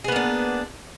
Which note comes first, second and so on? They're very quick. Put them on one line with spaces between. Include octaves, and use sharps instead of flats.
G#4 B3 A#3 D4